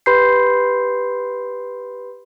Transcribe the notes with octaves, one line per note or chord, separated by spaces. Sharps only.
G4 B4 B5 C6 G6 C7